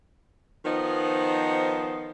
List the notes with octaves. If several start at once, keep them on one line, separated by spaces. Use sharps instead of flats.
D#3 F3 B3 D#4 C5 D#5